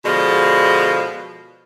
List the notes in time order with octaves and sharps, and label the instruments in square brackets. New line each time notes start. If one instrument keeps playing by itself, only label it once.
[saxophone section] B2 D3 F3 G#3